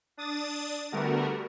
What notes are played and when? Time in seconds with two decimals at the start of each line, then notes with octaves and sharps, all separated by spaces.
0.17 D4 D#6 A6
0.92 D3 G3 A3 B3 F#4 A#4